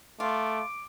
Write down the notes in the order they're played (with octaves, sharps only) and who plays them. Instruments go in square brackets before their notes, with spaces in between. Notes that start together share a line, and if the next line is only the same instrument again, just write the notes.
[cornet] A3 [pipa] F4 [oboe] D6